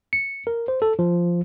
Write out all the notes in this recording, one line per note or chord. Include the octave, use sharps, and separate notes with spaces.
C#7
A#4
C5
A4
F3